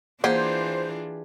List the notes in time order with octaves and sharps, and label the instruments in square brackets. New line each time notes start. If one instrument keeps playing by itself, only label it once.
[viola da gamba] E3 D4 F4 [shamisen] A#3 F#5 [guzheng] G4 G#4 [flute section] C5